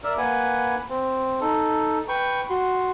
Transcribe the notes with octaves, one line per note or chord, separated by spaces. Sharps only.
A#4 D5 E5
A#3 B4 F#5 G#5
C4
D#4 A4
B4 G5 C#6
F#4 C6